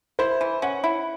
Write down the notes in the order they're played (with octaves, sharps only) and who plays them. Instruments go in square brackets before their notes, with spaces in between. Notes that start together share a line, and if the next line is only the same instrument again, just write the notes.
[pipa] E4 [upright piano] C5
[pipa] E3
[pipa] C#4 [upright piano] F#5
[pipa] E4